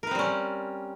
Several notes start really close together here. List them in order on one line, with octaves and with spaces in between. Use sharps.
A#4 B4 C4 G3 C#4